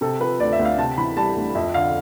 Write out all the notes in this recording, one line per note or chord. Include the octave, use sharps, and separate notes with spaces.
C3 A4
F3 B4
D2 D5
E5
D2
F5
C3 A5
E3 B5
G3 A5
D2
F2 E5
D3 F5